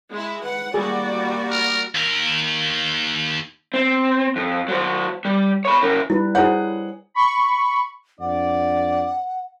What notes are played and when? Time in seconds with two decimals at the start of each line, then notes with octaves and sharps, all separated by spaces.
0.10 G#3 E4
0.43 B4 F#5
0.74 G3 A#3 F#4 G#4 D5
1.51 A#4
1.95 D#2 A#4
3.74 C4
4.36 F2
4.68 F#3 C5
5.25 G3
5.65 C#5 B5
5.83 C#3 A#4
6.10 G3 E4 B4
6.35 E4 G#4 C5 C#5 F#5
7.14 B5 C#6
8.20 F2 D4 D5 F#5